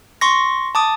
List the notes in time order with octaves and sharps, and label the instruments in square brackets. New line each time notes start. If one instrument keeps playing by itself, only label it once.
[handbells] C6 C#6 A#6
A5 D6 D#6